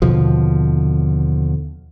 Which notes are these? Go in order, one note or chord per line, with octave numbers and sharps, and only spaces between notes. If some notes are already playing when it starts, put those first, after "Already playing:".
D#2 B2 D3 F3